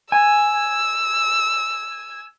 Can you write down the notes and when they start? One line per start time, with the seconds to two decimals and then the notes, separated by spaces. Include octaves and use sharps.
0.12 G#5 E6